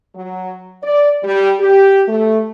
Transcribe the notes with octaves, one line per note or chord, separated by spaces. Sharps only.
F#3
D5
G3
G4
A3